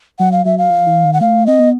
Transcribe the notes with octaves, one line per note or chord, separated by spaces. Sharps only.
F#3 F#5
F5
F#3 E5
F5
F3
E3
D#3
F#5
A3 F5
C4 D#5
B3